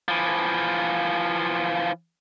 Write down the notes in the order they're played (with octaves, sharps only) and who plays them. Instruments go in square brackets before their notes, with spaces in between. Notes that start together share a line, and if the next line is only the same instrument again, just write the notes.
[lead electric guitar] E3 F3